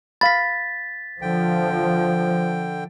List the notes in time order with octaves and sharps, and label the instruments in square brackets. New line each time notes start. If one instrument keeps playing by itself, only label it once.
[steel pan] F5 B5 [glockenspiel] A6 B6
[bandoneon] D3 G5 [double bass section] F3